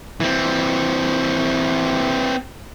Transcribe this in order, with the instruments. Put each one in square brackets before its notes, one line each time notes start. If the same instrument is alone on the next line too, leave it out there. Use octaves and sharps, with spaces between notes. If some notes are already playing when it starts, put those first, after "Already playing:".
[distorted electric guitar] E3 C4